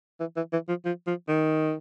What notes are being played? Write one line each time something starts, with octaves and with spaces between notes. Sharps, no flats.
E3
E3
E3
F3
F3
F3
D#3